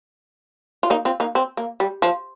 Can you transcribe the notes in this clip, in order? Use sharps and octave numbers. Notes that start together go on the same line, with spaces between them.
F4
A#3 D#4
C4 F4
A#3 D#4
C4
A#3
G3
F3